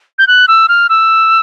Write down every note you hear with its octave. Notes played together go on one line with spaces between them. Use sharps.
G6
F#6
E6
F6
E6